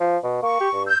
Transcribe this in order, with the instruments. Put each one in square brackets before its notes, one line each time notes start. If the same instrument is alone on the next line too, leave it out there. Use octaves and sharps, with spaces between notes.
[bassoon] F3
B2
[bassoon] A#3 [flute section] C#6
[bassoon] G4
G2
[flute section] E6 G6